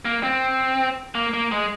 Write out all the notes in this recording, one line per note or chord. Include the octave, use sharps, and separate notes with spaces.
A#3
C4
A#3
A#3
G#3